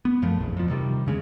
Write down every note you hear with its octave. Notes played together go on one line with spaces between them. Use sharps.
B3
F#2 F3 A3
A#1 E2
F2 F3
C3 D#3 G3
E2 C#3 G#3